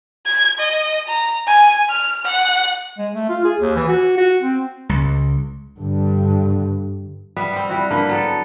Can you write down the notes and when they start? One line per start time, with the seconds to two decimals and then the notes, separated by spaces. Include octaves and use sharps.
0.26 G#6
0.59 D#5
1.08 A#5
1.47 G#5
1.89 F6
2.25 F#5
2.98 G#3
3.14 A3
3.29 F4
3.44 G#4
3.60 D#2
3.76 E3
3.88 F#4
4.18 F#4
4.43 C4
4.89 C#2
5.79 G2 D3
7.36 G3 B3 E5
7.53 G3 C4
7.69 G3 E4 F#4
7.91 D3 A#3 B4
8.09 F#3 B3 A4